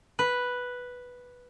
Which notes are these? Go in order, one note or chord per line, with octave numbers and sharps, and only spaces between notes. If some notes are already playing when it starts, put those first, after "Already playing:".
B4